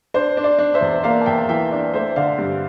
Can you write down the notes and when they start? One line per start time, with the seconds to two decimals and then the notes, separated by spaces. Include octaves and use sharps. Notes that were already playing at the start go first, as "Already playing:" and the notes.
0.14 D4 C5
0.37 D4
0.44 D5
0.59 D4
0.74 C5 E5
0.81 E2
1.03 A#3 D5 F5
1.21 A5
1.26 E2 E5 G5
1.49 E3 E5 G5
1.72 D4
1.93 A3 C5 E5
2.16 D3 D5 F5
2.38 G2